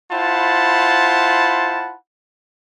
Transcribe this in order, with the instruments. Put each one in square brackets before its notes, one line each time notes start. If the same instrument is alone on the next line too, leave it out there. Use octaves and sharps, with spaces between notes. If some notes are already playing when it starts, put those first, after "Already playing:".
[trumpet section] E4 F4 C5 F#5 A5 B5